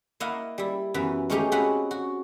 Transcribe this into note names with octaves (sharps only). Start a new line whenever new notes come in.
A#3 E4 D#5 F5 F#5
G3 E4
F#2 E3 B3
G#3 A3 C#4 D#4 G4 G#4
C4 C#4 F#4 G#4 B4 F#5
F#4